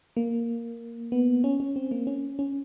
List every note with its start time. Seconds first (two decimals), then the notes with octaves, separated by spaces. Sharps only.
0.17 A#3
1.12 B3
1.44 C#4
1.60 C#4
1.76 C4
1.91 A#3
2.07 C#4
2.39 C#4